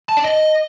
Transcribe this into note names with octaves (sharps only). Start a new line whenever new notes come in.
A5
D5
D#5